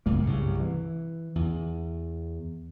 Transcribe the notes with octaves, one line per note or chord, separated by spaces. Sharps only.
C#2 F#2 A2 A#3
C2 G2 C#3
E3
E2